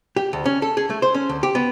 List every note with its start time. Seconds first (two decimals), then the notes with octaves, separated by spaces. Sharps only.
0.16 G4
0.33 D2
0.46 C#4
0.62 A4
0.77 G#4
0.90 A3
1.02 C5
1.14 C#4
1.29 D2
1.43 G4
1.55 B3